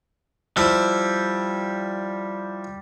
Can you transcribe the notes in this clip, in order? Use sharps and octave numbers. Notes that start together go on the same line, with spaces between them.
F3 G3 E4